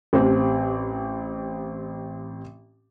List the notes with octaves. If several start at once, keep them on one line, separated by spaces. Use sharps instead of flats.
A1 C4 G4